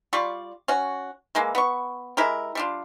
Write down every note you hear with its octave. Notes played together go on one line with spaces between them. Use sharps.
G3 F4 D5 C#6
C#4 F#4
E3 G#3 A#3
B3 C#6
G#3 E4 G4 A#4
G3 D4 F4